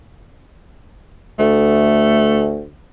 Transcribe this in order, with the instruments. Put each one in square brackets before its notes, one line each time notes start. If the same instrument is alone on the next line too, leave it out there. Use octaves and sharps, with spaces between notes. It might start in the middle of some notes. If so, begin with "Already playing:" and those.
[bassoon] D2 [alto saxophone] A3